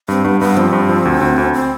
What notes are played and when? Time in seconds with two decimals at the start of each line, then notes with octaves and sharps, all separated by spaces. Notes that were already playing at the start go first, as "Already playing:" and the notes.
0.08 G2 C4
0.24 G2 B3
0.40 G2 B3
0.57 F3 C4
0.73 G2
0.89 F3
1.05 D2
1.21 D2
1.38 D2
1.54 C4